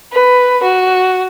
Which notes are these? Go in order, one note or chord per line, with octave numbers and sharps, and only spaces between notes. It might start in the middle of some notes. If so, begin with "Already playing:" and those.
B4
F#4